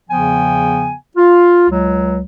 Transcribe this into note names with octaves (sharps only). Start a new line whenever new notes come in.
E2 C#3 F3 B3 G5 G#5
F4
C#2 F#3